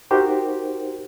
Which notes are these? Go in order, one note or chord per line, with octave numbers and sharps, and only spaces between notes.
D#4 F#4 G4 A#4 C5